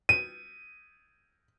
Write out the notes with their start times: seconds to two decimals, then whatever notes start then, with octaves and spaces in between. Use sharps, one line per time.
0.09 D#7